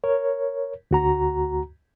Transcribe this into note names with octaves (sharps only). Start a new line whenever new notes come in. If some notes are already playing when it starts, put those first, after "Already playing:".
A#4 C#5
D2 F#4 A#5